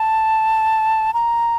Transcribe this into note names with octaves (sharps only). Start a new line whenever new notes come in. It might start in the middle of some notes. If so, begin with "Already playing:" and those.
Already playing: A5
A#5